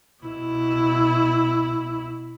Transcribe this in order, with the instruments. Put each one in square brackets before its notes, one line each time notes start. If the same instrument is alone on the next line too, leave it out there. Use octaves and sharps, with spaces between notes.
[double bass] B2 E4